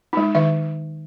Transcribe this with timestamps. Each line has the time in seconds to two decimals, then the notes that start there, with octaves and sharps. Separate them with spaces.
0.13 G#3 D#4
0.35 D#3 E5